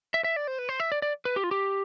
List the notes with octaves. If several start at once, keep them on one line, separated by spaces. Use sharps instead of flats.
E5
E5
D5
C5
B4
C5
E5
D5
D5
B4
G4
F4
G4